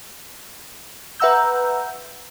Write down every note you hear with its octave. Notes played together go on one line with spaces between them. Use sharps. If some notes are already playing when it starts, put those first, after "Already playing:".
B4 E5 F#5 A#5 E6 G6